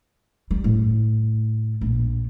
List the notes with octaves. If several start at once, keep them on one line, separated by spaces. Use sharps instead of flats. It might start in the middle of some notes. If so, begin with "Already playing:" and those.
G3
A2
A#1